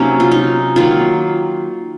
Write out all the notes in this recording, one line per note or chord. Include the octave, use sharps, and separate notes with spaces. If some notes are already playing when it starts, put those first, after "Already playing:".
Already playing: C3 F#3 A#3 C#4 D#4
F4
D#4
D#3 F#3 A#3 F4